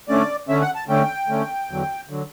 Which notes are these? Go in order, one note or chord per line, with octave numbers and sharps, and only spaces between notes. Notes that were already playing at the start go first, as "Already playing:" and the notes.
D3 A3 C#4 D5
D3 A3 C#4 E5
F#5
A5
D3 A3 C#4 G5
D3 A3 C#4
E2 D3 F#3
D3 F#3